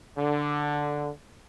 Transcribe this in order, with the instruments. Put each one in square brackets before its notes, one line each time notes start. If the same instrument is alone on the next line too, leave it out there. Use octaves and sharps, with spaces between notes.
[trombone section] D3